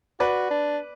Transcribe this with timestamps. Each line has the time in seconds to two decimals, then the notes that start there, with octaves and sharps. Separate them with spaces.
0.20 F#4 B4 D5
0.50 D4